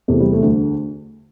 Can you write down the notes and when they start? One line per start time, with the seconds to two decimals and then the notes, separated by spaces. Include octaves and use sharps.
0.08 E2 C3 E3 A3
0.20 G3
0.33 A3
0.41 D2 D3